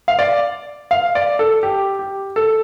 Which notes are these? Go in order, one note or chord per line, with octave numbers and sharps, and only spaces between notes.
F5
D5
F5
D5
A4
G4
G4
A4